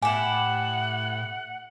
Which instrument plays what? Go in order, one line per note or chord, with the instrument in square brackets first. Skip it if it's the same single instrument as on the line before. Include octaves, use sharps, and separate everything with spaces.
[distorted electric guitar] A2 [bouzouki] E4 G4 [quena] F#5 [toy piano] G#5